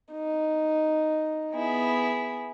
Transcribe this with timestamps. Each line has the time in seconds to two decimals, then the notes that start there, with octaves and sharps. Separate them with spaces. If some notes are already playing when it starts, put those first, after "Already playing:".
0.13 D#4
1.51 B3 E4 G#4